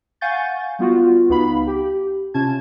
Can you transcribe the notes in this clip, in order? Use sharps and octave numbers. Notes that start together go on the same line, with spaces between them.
F5 F#5 G#5 C#6 G6 A6
G3 B3 F4 F#4
C#2 B3 D#4 F5 B5
G4
C3 C#4 F4 A5 G#6